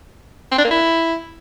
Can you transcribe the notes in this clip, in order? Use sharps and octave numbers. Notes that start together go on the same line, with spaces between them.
C4
D4
A#3
E4